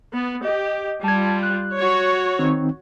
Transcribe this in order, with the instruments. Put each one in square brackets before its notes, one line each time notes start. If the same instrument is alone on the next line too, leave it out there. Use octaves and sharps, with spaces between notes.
[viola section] B3
[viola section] G4 [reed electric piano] D#5
[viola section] G3 F4 [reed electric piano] A5 G#6
[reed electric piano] F#6
[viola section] F#4 C#5
[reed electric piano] D#3 C4 D#4